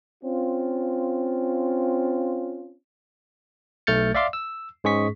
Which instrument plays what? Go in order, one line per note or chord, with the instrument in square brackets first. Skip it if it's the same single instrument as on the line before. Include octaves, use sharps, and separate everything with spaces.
[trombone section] C4 C#4 F4
[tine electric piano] B1 A3 F6 G6 A6 C#7
D5 E5 F5 C6 D6
E6
G#2 G#3 C#4 G#4 C#6 B6